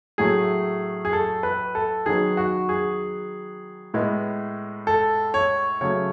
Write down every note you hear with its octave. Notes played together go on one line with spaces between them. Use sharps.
A2 F#3 A3 G#4
G#4
A4
B4
A4
D#3 F#3 B3 G#4
F#4
G#4
A2 G#3 B3
A4
C#5
C#3 F#3 A3 C#5